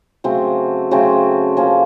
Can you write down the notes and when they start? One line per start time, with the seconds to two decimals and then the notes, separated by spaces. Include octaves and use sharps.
0.24 C#3 F#3 A3 C4
0.91 C#3 F#3 A3 C4
1.57 F3 A#3 C#4